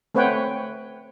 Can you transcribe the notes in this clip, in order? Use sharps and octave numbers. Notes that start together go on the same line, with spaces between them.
A3 C4 B4 C#5 F#5 G5